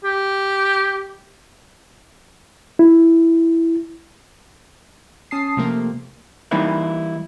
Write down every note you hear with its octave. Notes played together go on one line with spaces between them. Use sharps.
G4
E4
C#4 A5 D#6 C7
C3 F3 A3 A#3
E3 G3 A#3 D#4 E4 B4